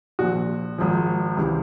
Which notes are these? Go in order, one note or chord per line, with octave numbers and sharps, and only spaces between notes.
A#1 A#2 F3 F#4
G#1 G#2 F3
C#2 C3 E3